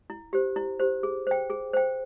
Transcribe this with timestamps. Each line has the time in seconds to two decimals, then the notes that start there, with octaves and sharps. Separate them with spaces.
0.10 E4
0.33 G4 C5
0.56 E4
0.80 G4 C5
1.03 G#4
1.27 C5 G5
1.50 G#4
1.73 C5 G5